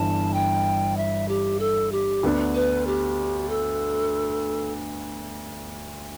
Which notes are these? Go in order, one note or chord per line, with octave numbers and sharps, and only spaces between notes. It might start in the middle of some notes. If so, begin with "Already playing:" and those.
Already playing: G1 G2 E3 A5
G5
E5
G4
A4
G4
D2 D3 B3 D4
B4
G4
A4